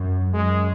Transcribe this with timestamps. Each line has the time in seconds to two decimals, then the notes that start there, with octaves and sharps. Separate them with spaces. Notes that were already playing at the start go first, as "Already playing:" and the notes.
Already playing: F#2
0.34 F#2 G#3